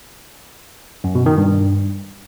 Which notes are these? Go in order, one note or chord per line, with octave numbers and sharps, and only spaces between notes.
F#2
B2
D#3
G2